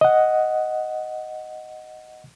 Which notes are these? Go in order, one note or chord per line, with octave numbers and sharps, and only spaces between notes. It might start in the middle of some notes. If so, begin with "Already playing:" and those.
D#5 F#5